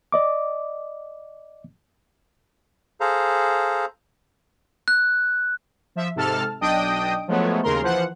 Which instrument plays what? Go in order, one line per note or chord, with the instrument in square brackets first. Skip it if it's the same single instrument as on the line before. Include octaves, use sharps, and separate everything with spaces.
[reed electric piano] D5 D#5 D6
[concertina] G#4 A4 C5 F5 A#5
[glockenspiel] F#6
[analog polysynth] F3 E5
G#2 C3 A4 A5 F6
B1 D4 D#5 G5 D#6 D7
F3 F#3 G#3 A3 B3 C#5
D#2 C#3 A#4 A#5 C6
E3 F3 C5 F#5